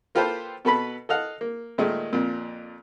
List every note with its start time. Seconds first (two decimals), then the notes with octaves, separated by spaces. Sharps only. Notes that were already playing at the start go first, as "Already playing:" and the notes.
0.15 A#3 F4 G4 A4 B4 C5
0.65 B2 A4 B4 B5
1.09 A4 D#5 F5 F#5
1.41 A#3
1.78 A#2 D#3 G#3 A3
2.13 F2 A#2